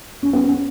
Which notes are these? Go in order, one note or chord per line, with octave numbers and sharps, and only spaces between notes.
C#4
B3
C#4